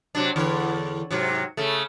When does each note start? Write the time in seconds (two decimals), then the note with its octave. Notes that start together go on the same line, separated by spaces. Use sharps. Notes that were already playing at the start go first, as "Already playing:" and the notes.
0.15 C3 F#3 D4
0.36 E2 D3 C#5
1.11 G#2 C3 F#3
1.57 C#3 A3